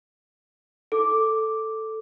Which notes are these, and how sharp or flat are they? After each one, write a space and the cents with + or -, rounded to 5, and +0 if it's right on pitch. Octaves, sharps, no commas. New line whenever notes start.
A4 +0 D6 +0